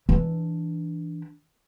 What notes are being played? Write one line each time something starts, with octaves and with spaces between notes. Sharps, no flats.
E3 D4